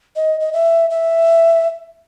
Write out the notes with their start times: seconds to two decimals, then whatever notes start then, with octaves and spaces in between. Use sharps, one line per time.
0.16 D#5
0.40 D#5
0.53 E5
0.90 E5